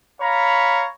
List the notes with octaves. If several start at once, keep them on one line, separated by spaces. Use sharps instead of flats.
C#5 F5 A#5 B5